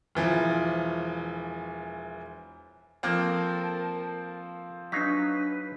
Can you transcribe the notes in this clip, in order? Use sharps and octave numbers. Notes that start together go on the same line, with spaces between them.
E1 E3 F3
F3 A#3 C4 A4 A#4 A5
F#3 D4 D#4 B4 F5 B6